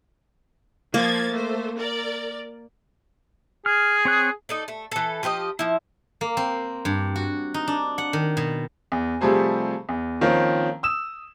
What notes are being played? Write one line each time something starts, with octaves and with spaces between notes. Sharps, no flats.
F3 A#3 G#6 A6
A3 C5
A#4 D5
G#4 F6
C4 C#5 F#6
D#4 A4 D5
A3
E3 A4
F3 G4 B4 D#5
F3 E4
A#3
C4
G2
F#4
D#4
D4
F#5
D#3
B2
E2
C3 F3 G3 A3 G#4 C5
E2
D#3 F3 A#3 C4 C#4
D#6 E6 E7